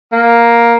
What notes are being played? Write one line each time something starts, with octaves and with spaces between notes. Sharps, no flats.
A#3